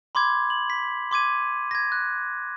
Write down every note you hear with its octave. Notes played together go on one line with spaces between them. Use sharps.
B5 C6 D6 G#6
F#7
B6
C6 D6 G#6 D#7
G#6 A#6
F#6